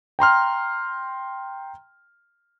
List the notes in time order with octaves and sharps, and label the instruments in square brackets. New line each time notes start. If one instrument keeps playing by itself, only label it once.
[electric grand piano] G5 A#5 C6 F6